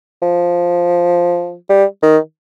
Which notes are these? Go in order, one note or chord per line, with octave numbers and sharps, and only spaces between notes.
F3
G3
D#3